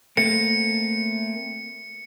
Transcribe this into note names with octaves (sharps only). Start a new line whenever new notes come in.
A3 A#3 C4 C#7